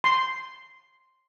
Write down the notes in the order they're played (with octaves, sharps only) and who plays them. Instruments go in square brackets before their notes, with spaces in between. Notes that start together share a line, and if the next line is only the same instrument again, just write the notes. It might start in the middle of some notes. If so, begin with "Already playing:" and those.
[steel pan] C6